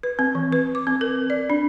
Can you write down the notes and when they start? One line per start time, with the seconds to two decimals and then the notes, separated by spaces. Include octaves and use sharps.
0.03 B4
0.19 C4
0.35 E3
0.52 B4
0.75 D6
0.87 C4
1.01 A#4
1.30 D5
1.50 D4